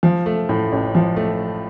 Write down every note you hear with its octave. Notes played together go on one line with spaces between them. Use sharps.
F3
A3
A2
A1
F3
A3